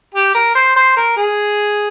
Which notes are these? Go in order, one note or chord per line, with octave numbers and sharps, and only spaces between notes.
G4
A#4
C5
C5
A#4
G#4